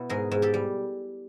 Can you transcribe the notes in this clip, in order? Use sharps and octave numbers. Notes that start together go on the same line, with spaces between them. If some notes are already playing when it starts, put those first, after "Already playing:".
Already playing: B2 E4
G#2 G#4 A#4
G#2
G4 A4
G3